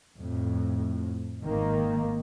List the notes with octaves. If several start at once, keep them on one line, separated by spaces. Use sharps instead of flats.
F2 A2
G#1 D#3 A#3